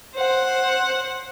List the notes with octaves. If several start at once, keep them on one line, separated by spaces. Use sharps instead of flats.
C5 F#5